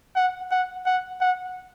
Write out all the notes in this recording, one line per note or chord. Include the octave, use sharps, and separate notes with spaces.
F#5
F#5
F#5
F#5